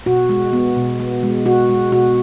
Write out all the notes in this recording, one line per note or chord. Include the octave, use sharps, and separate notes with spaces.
B2 F#4
G#3
B3
B2
B3
G#3
B2 F#4
G#3
B2 F#4